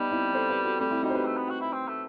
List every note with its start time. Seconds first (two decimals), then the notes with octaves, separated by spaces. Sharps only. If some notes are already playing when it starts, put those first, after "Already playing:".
Already playing: G3 B3 D#4
0.11 C4 E4
0.34 A4 C5
0.50 G4 B4
0.65 F#4 A4
0.80 G3 A3 C4
0.91 C4 E4
1.03 G3 D#4 F#4
1.10 C5
1.15 G4 B4
1.25 A3
1.37 B3
1.50 F#4
1.60 E4
1.73 C4
1.87 A3